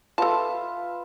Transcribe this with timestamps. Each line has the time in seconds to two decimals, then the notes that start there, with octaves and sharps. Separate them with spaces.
0.18 F4 A4 B4 E5 A5